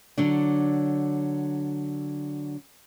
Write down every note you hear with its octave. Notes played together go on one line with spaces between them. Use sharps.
D3 F#3 D4